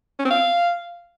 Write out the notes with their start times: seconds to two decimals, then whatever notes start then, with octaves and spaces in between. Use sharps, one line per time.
0.19 C#4
0.25 C4
0.31 F5